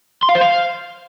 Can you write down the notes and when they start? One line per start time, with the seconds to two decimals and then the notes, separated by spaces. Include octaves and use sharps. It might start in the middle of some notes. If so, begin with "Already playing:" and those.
0.23 C6
0.29 F5
0.35 C5
0.41 F5